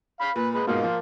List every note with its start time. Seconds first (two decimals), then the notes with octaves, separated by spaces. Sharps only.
0.21 F5 B5
0.36 A#2 B4
0.54 G#3 B4
0.67 G#2 B2 A#3 F4
0.84 F3